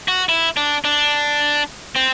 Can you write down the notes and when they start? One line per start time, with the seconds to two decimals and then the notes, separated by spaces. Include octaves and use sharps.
0.08 F#4
0.29 E4
0.57 D4
0.85 D4
1.96 C4